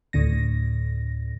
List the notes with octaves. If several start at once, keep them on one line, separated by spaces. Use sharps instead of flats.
D2 A2 D3 A#6